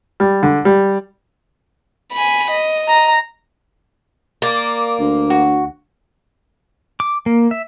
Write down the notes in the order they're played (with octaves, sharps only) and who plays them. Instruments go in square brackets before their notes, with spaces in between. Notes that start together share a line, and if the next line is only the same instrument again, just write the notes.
[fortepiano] G3
D3
G3
[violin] G#5 B5
D#5
[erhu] A#5
[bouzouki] A#3 [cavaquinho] D5
[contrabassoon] D2
[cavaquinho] F#4
[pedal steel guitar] D6
A#3
E5